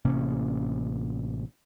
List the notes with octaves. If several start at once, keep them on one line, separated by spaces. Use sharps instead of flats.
A1 C3 A#3 C#4